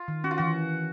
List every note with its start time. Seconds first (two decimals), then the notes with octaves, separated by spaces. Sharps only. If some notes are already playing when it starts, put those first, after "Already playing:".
Already playing: F4
0.08 D#3
0.24 C#4 F#4
0.31 F4
0.38 E3 F#4